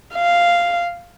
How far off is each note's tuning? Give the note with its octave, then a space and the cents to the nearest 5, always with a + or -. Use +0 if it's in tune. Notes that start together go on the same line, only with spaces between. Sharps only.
F5 -5